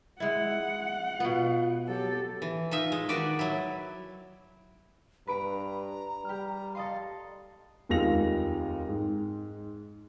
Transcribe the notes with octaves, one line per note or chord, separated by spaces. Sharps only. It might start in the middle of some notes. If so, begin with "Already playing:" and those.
G#3 E4 F#5
B2 B3 F4
F#3 G4 A4
E3
D#4 F4 E5
G#3
D#3 F#4 G4 B4 D5
F#3 E4
G2 B4 A#5 B5 D7
G3 G4 F6
A4 D#5 F5 C6
F1 D#2 G#3 F4 A#6 F7
G#2